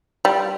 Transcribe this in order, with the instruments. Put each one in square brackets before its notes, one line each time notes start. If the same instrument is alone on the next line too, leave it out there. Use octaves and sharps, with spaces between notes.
[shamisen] G3